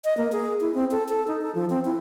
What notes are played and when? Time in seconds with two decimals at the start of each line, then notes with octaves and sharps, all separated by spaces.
0.04 D#5
0.17 A#3
0.32 G#4
0.61 E4
0.74 C4
0.91 A4
1.08 A4
1.27 D#4
1.42 A4
1.55 F3
1.70 C4
1.85 E4